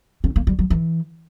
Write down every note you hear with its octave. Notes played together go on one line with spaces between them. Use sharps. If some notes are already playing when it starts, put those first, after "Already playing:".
C#4
A#3
G3
F#3
E3